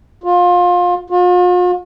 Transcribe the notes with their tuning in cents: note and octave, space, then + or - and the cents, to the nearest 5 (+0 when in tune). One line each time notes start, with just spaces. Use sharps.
F4 +25
F4 +45